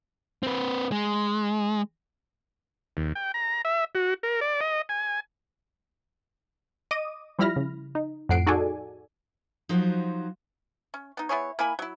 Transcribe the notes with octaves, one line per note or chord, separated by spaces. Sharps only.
C4 B4
G#3
D#2
G5
A#5
E5
F#4
A#4
D5
D#5
G#5
D#5 D6 D#6 D#7
F3 G3 E4 B5 F6 A#6
C#3
D#4
F2 A2 F#5 C7 D7
D#4 F#4 G#4 A4 D5 G#5
F3 F#3 D#4 F#4 C5
C#4
B3 D#4
B3 E4 G#4 C#5
A#3 E4 G#5 B5
F#3 E4